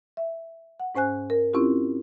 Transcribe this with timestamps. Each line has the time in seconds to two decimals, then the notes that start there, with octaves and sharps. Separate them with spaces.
0.17 E5
0.80 F#5
0.95 G#2 C#4 C5 G#5 F#6
1.30 A#4
1.53 C4 C#4 E4 F4 G4